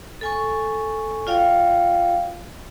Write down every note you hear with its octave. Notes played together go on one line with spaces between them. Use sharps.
A4 G#5 C#6
F4 F#4 D5 F5 G5